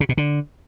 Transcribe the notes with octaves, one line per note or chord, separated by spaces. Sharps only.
C#3
B2
D3